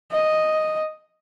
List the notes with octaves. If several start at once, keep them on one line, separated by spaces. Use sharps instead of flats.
D#5